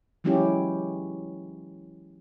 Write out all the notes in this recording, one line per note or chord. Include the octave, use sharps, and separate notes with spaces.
E3 F#3 G#3 C#4 E4 G4